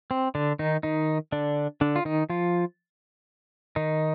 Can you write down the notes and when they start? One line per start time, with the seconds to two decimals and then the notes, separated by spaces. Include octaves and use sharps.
0.11 C4
0.35 D3 D4
0.59 D#3 D#4
0.83 D#3 D#4
1.32 D3 D4
1.81 D3 D4
1.96 F4
2.05 D#3 D#4
2.30 F3 F4
3.76 D#3 D#4